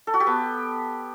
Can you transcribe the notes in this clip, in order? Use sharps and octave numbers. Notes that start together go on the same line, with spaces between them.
A4
F#4
G4
B3